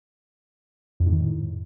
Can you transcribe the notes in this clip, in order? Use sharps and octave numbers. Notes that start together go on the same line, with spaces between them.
F2
G#2
D#3
A2